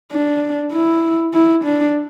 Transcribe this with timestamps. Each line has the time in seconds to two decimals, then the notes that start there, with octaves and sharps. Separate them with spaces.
0.12 D4
0.73 E4
1.34 E4
1.64 D4